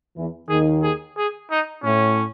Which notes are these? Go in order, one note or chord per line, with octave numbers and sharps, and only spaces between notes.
E2 E3
D#2 D#3 G#4
G#4
G#4
D#4
A2 C#4